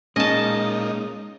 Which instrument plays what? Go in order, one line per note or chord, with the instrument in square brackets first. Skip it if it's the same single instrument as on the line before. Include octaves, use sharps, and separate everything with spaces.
[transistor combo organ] A#2 D#4 [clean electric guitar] G#3 [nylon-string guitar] C#4 [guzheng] D#5 A5